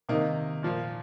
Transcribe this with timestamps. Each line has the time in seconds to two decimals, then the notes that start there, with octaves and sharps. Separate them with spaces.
0.09 C3 D#3 A#3 D#4
0.63 A#2 F3 A#3